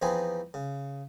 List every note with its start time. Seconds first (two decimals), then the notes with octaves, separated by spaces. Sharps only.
0.02 E2 F3 C4 D#4 B4 G#5
0.54 C#3